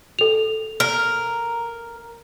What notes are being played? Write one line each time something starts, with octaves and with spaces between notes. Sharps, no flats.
A4 F7
A#4